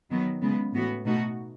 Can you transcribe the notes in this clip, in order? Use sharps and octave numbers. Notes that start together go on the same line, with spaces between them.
D#3 F#3 B3
C#3 G#3 B3
A2 E3 B3 F#4
B2 A3 D#4 F#4